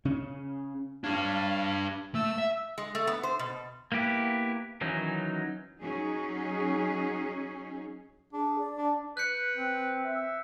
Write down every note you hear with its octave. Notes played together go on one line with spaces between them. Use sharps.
C#3 C#4
D4 G4 C#5 F5
A3 E6
E5
G#3
A3
B3
C5
B2
A#3 B3 E4 G4 B4
D#3 E3 F#3 C#4 D#4
F#3 C#4 D#4 G#4
D4 G#4
D5
D4
B4 F#6 G6 C#7
C4
E5